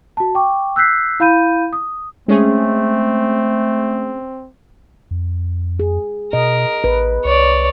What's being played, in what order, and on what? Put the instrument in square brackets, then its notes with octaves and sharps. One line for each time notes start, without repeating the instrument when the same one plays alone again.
[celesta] F#4 A5
G5 C#6 D6
E6 F#6 G6 B6 C7
E4 F5 B5 G6 D#7
D#6
[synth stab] G#3 C#4 G#4 [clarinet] A3 [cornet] C4
[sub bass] F2
[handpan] G#4
[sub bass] B2 [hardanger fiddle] A#4 [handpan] D#5
[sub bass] A1 [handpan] B4
[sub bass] C2 [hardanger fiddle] C#5 D5